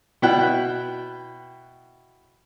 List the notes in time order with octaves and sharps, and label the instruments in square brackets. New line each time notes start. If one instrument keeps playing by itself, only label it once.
[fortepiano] B2 E4 G5 F#6